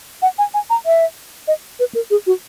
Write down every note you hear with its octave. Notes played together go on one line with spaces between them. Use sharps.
F#5
G#5
G#5
A#5
E5
D#5
B4
A#4
G#4
F#4